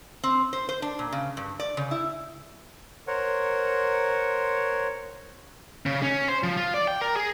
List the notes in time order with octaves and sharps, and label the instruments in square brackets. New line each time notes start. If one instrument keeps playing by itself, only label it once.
[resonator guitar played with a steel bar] C4
C5
C5
D4
A#2
C#3
G2
D5
C#3
E4
[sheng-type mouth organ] A#4 C5 C#5 F#5
[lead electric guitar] C#3
C#4
C5
F3
F4
D5
G5
A#4
G#4